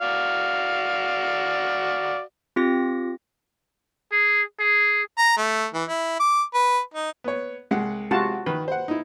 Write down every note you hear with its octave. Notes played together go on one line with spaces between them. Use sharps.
F#4 D5 F5
C4 F4 G4 A#6
G#4
G#4
A#5
A3
E3
E4
D6
B4
D#4
B3 C#5
C2 G#3 F#5
C3 G#3 F4 F#4 A5
D#3 B4
C5 F#5
D#4 E4